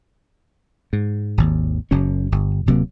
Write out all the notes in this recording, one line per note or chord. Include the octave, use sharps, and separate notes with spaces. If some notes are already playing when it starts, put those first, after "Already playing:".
G#2
G#1 D#2
F#1 F#2 C#3 C#4
G1
D1 C3 F#3 A#3